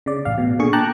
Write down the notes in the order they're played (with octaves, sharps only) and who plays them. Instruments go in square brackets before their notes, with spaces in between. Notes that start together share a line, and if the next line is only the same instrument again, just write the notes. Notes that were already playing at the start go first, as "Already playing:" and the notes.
[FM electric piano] C#3 D5
A1 F5
B2
A#2 D3 G#4 C#6
G5 A5 A#5 D6 F#6